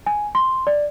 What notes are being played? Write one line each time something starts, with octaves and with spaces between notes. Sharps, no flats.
G#5
C6
D5